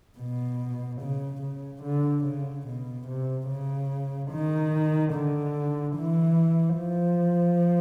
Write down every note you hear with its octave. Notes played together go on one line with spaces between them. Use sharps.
B2
C#3
C#3
D3
C#3
B2
C3
C#3
D#3
D3
E3
F3